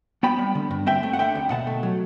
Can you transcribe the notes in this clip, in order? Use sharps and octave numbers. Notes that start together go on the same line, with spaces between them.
B3 G5 B5
G3
D3
G2
C4 E5 G5
A3
F#5
D3 E5 G5
D2
B2 F#5 A5
A3
F#3